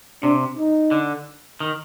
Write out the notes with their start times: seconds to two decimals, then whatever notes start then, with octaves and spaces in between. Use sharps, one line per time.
0.22 C3 D4
0.57 D#4
0.91 D3
1.60 D#3